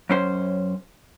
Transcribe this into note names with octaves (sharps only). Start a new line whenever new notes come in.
F#2 C#4 C5